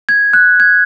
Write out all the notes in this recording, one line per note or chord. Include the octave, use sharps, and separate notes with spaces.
G#6
F#6
G#6